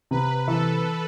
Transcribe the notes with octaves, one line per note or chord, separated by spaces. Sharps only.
C3 B4
E3 A4